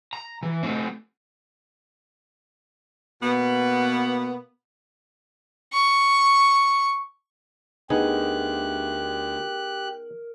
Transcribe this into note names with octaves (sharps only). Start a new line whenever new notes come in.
A#5
E3
A3 C4
B2 A#3 B3
C#6
D2 D3 B3 D#4 G4 G#4 A#4 F#6